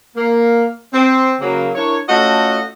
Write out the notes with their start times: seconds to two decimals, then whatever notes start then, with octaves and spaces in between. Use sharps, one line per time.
0.16 A#3
0.92 C4
1.40 C#3 F#3 A#3
1.74 D4 E4 A#4 C#5
2.08 A3 C#4 F4 F#4 A4 D#5